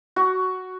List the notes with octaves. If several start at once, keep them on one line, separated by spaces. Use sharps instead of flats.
F#4